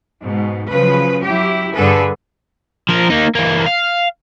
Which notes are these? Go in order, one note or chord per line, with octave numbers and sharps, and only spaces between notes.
G#2 B2
C#3 F3 F#3 B4
F#3 E4 G4
G2 D3 G#4 A4 B4
F3 A#4
A#3 D#4
E3 A#3
F5